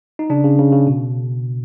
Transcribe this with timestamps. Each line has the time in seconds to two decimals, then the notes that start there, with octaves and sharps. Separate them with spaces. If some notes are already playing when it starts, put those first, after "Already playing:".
0.19 D#4
0.30 C#3 D4
0.44 C#3
0.59 C#3
0.72 C#3
0.87 B2